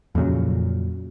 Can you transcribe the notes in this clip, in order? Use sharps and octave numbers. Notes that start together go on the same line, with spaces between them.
F2 A#2 C#3 F#3